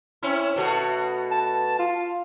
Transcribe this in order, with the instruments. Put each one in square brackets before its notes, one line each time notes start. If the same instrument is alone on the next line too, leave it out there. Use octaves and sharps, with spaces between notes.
[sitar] C4 C#4 E4
B2 A3 F#4
[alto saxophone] A5
F4